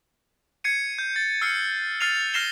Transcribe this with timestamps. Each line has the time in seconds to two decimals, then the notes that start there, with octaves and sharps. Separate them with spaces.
0.64 G#6 C7 C#7 D#7
0.98 G6
1.16 A6
1.41 E6 F6 C7 C#7
2.00 F6 A6 C7 D#7 F7
2.34 F6 A#6 C7 E7 G7